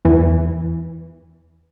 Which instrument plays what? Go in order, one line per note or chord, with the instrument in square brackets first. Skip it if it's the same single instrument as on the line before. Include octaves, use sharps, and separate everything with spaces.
[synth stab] E2 E3